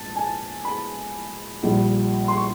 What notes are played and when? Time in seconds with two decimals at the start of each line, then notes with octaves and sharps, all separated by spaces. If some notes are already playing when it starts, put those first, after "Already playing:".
Already playing: A#1 G#2 A5
0.16 G#5
0.65 B5
1.63 A#1 A#2 G3
2.28 C6
2.37 C#6